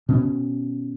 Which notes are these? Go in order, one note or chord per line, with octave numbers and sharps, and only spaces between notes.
B2 C#4